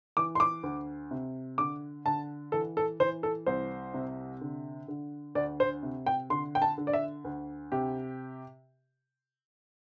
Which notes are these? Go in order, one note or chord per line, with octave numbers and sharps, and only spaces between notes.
E3 D6
C6
D6
D2
C3
D3 D6
D3 A5
E3 A4
A4
E3 C5
A4
C2 C5
C3
D3
D3
D2 D5
C5
C3
G5
D3 C6
G5
A5
D3
D5
E5
D2
C3 G4